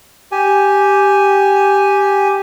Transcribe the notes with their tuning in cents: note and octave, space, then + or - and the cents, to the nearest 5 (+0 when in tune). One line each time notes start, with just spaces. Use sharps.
G4 +0 G#5 +0